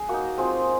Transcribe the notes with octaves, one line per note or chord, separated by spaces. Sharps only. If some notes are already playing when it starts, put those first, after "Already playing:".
Already playing: G#4
A#3 D#4 F#4
G#3 C4 F4